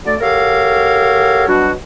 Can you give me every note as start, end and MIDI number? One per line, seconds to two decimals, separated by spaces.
0.05 0.14 50
0.05 0.14 54
0.05 0.14 57
0.05 0.14 74
0.21 1.46 66
0.21 1.46 67
0.21 1.46 69
0.21 1.46 70
0.21 1.46 73
0.21 1.46 77
1.47 1.71 47
1.47 1.71 54
1.47 1.71 55
1.47 1.71 62
1.47 1.71 66